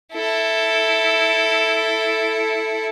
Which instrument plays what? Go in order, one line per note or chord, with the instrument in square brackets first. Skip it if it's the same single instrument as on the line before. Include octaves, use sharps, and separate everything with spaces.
[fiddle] E4 A4